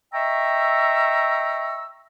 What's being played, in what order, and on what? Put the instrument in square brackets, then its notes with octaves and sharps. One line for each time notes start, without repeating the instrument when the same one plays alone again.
[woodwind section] D#5 E5 G5 A#5 C#6 E6